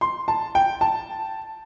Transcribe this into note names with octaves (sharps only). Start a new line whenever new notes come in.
C6
A5
G5
A5